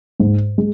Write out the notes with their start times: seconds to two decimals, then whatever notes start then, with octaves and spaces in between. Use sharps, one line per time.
0.20 G#2
0.58 G#3